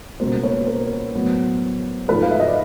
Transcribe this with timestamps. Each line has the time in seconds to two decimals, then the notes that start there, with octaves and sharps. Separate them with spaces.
0.20 C#2 B2 G3 A#3 A#4 C5
0.43 B4 C#5
0.66 A#4 C5
1.14 A2 F#3 B3
2.08 G#2 F3 A3 A4 B4
2.22 F5
2.31 E5
2.40 D#5
2.48 D5